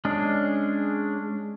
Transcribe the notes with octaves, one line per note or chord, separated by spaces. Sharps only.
G#3 C#4 D4 G#4